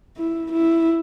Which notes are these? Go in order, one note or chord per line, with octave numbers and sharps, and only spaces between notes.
E4
E4